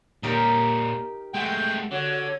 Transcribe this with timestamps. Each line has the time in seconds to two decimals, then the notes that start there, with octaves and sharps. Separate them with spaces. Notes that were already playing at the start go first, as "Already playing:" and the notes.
0.23 A#2 D#4 G4 A#4 C#5
1.34 G#3 A3 F#5 G5
1.92 D3 F#4 C#5